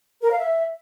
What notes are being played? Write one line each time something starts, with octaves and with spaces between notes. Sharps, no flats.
A#4
F5
E5